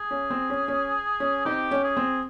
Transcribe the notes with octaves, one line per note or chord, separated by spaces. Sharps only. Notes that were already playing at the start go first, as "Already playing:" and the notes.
Already playing: G#4
C#4
C4
C#4
C#4
C#4
C4 D#4 G4
C#4
G#4
C4